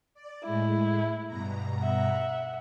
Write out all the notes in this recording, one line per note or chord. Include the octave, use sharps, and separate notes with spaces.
D5
A2 G#3 E4
G2 B2 A#5
E5 F#5